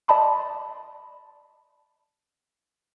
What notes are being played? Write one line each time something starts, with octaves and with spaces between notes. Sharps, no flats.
D5 D#5 A5 B5 C6